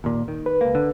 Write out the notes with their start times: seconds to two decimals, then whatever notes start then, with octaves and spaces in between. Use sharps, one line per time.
0.04 D#2 A#2
0.28 D#3
0.46 B4
0.61 C#2 A#3
0.75 D3